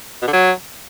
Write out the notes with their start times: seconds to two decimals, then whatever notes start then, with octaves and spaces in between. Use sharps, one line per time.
0.22 B2
0.27 D3
0.33 F#3